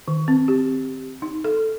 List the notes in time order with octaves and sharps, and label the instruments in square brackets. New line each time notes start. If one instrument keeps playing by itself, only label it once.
[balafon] D#3
C4
G4
D#4
A4